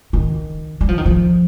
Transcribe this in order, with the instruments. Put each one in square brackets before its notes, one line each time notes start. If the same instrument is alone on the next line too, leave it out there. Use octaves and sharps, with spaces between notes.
[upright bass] D#3
G3
F3
D#3
F3